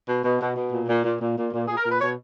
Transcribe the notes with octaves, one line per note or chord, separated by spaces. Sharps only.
B2
B2
B2
B2
A#2
A#2
A#2
A#2
A#2
A#2
A#2 G#4
A#4
A#2 B4
B2 C#5